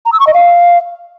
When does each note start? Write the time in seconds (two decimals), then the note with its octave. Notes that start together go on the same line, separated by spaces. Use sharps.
0.05 A#5
0.13 E6
0.20 C#6
0.27 D#5
0.34 F5